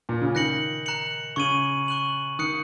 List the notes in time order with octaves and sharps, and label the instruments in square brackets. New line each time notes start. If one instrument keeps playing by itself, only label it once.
[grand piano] A#2
C#3
[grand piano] D#3 [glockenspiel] F#6 A#6 C#7 F#7
[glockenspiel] A#5 F#6 C#7 F#7
[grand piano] C#3 [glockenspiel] C#6 G#6 D#7 F#7
[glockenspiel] C#6 F#6 D#7 F#7
[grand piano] D#3 [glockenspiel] D#6 F#6 C#7